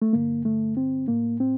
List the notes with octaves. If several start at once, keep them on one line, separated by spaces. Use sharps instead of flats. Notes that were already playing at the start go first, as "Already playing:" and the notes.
A3
G2 D3 A#3
A3
C4
A2 A#3
C4